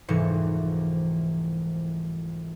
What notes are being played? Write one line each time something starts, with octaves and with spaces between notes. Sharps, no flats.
F1 C2 G#2 E3 C#7